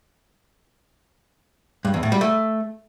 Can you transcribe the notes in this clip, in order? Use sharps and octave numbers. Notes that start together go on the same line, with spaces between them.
G2
E2
A2
G3
A3